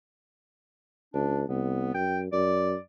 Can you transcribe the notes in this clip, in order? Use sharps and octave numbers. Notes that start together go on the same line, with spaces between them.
C#2 D4
C2 B3
F#2 G5
F#2 D5